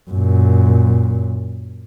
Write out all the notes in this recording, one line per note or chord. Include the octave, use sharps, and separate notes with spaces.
F#2 A#2